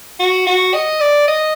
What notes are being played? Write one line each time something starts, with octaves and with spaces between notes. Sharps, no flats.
F#4
F#4
D#5
D5
D#5